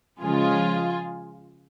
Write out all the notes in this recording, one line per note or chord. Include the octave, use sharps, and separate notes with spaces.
C#3 F3 G#3 F4 G#4